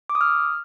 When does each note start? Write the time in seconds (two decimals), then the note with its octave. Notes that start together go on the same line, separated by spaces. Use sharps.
0.10 D6
0.15 D#6
0.21 F6